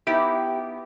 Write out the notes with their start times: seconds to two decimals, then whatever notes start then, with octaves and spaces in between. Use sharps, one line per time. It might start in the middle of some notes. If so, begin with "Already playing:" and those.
0.07 B3 D#4 E4 G4